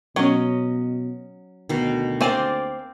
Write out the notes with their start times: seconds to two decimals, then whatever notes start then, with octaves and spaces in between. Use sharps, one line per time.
0.16 B2 F#3 C#4 D#5
1.69 D2 B2 D#3
2.21 A#3 C4 C5 D5 F5 G#5